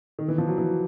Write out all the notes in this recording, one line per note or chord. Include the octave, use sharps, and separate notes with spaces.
D#3
E3
F3
F#3
E3